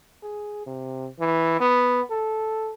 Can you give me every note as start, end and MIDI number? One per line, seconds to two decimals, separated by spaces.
0.23 0.62 68
0.66 1.08 48
1.20 1.59 52
1.60 2.02 59
2.11 2.73 69